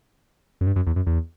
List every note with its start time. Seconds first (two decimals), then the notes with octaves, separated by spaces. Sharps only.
0.61 F#2
0.67 G2
0.76 F#2
0.87 E2
0.96 F#2
1.07 E2